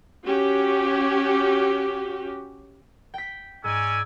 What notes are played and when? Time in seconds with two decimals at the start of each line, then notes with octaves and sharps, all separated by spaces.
0.25 C#4 F#4 G4
3.14 G5 B6
3.64 G#2 C#4 D5 G#5 E6